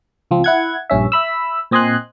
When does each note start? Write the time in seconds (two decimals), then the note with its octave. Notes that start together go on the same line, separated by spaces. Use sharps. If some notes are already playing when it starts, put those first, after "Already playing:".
0.31 C#2 F3 C4
0.44 E4 F#5 G#6
0.90 A#1 G2 C#4 E5
1.12 E5 B5 E6
1.71 A#2 C4 D#5 G#5 C6 F#6